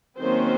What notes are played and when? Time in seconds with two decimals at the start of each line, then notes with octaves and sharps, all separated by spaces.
0.20 D#3 F#3 A#3 C4 C#4 C5